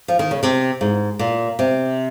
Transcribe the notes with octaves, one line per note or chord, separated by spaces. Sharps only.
F3
D#3
C#3
C3
G#2
A#2
C3